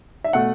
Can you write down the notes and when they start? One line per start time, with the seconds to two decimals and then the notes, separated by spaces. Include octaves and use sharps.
0.24 E5
0.33 B2 A3 F#5